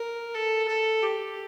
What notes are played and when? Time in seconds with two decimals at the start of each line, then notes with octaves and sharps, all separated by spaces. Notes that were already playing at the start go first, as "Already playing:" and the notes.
Already playing: A#4
0.34 A4
0.68 A4
1.03 G4